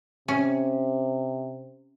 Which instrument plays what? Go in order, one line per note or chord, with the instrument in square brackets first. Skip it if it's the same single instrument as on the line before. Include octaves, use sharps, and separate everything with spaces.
[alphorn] C3 [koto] C#4